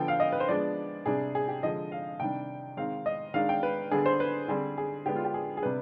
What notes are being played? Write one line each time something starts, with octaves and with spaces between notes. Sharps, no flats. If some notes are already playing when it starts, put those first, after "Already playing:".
Already playing: D3 F3 B3 G5
F5
D#5
B4
C5
F3 G#3 B3 D4 D5
C3 G3 D4 G#4
G#4
G4
D3 F3 G#3 D#5
F5
C3 D#3 G3 D4 G5
D#3 G#3 C4 F5
D#5
D#3 G#3 D4 F5
G5
B4
D3 G3 B3 D4 G#4
C5
B4
D3 G3 C4 G#4
G#4
D3 G#3 B3 D4 G4
F4
G4
G#4
G#4
C3 G3 B3 D4 B4